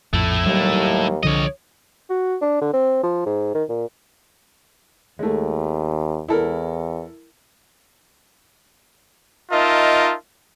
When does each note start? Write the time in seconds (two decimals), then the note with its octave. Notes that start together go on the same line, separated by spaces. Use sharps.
0.13 A#1 F2 A2 A3 E4
0.46 D#2 F#3 G3
1.23 C2 D3 F3 C#5 D#5
2.10 F#4
2.42 D4
2.61 D3
2.73 C4
3.03 F3
3.26 G#2
3.55 D#3
3.69 A#2
5.19 D#2 G#3 A3
6.29 E2 E4 A4 A#4
9.52 D#4 F4 A#4 D#5 E5 A5